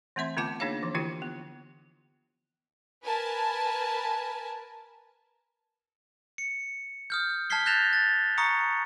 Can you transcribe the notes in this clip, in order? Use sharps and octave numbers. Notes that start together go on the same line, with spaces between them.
E3 A3 C4 E5 C6
D3 A3 B3 F4 A5 D6
A#3 D4 D#4 G#4 C#5 F5
E3 F3
D3 E3 E4 F4 G4 G5
B3
A#4 B4 G#5 A5
C#7
D#6 F6 G6
A5 F6 G#6 B6 C7 G7
F#6 G6 A6 A#6 E7 F7
A6
A#5 C#6 D#6 C#7